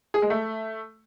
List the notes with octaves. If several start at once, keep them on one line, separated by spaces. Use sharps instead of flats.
G#4
G#3
A3